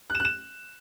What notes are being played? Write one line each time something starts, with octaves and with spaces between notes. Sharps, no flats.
F#6
E7
F#6
E7